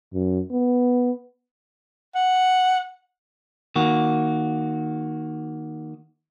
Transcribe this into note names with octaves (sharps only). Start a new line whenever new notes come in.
F#2
B3
F#5
D#3 A#3 F#4